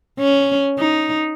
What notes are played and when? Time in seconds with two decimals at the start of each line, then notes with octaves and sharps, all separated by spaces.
0.19 C#4
0.79 D#4